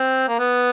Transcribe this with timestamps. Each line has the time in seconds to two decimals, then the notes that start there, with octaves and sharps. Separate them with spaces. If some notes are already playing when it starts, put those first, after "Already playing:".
Already playing: C4
0.28 A#3
0.39 B3